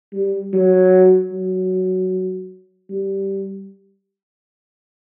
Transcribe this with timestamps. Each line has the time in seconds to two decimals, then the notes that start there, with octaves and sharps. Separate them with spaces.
0.13 G3
0.53 F#3
1.32 F#3
2.90 G3